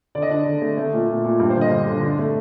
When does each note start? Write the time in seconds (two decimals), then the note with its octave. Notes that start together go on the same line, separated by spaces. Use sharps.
0.15 D3 D5
0.22 D#5
0.30 D4 D5
0.46 D3
0.62 A3
0.77 A3
0.93 A#2
1.09 A#2
1.24 A#2
1.40 G2
1.50 C5
1.56 D3
1.61 D#5
1.71 G2
1.87 D3
2.03 D4
2.19 A3